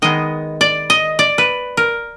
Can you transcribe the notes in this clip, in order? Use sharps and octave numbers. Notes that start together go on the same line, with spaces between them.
D#3 G#3 B3 D#5
D5
D#5
D5
B4
A#4